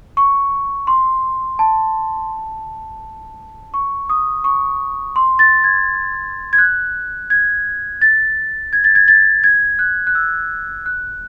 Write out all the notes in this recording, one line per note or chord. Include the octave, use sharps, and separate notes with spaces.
C#6
C6
A5
C#6
D#6
C#6
C6
A6
G#6
G#6
F#6
G#6
A6
G#6
A6
G#6
A6
G#6
F#6
F#6
E6
F#6